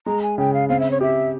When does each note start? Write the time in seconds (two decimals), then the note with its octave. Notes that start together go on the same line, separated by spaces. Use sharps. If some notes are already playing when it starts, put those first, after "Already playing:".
0.06 G#3 A#5
0.22 G#5
0.38 C#3 G5
0.54 F5
0.69 C4 F5
0.80 E5
0.91 C#5
1.01 G4 E5